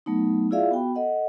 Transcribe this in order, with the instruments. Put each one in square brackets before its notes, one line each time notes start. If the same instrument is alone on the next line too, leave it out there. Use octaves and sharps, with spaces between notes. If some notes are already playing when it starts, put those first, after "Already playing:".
[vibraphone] F#3 A3 B3 D#4
E4 F4 G#4 D5 E5 F5
B3 F#4 G5 B5
A4 D#5 F#5